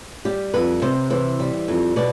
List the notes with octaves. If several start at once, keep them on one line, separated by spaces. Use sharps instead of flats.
G3 G4
F2 B4
C3 C5
E3 C5
G3
F2
B2 D5